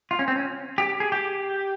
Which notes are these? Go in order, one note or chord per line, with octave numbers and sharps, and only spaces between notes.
F4
C#4
C4
C#4
G4
G#4
G4